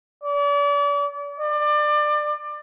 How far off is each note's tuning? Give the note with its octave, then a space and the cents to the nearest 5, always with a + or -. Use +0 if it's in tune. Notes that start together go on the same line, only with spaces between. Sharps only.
D5 -40
D5 +25